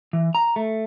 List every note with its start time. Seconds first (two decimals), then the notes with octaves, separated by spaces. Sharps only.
0.13 E3
0.35 A#5
0.56 A3